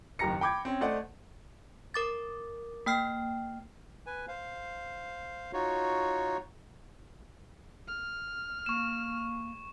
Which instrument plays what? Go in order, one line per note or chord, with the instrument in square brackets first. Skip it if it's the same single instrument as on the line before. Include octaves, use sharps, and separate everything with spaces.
[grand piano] F#1 D#3 G4 A#5 A#6 C#7
G5 B5 D6 G6 G#6
C4 C#4
A3 C5 D5 D#5 F#5
[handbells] A#4 D6 A6
A#3 G5 F6 C7
[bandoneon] B4 G#5
C5 F5
D#4 F4 F#4 C#5
[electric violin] F6
[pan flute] A#3 [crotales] C#6 E7